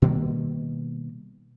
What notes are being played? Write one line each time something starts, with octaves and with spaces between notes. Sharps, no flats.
B2 D#3 G3 A#3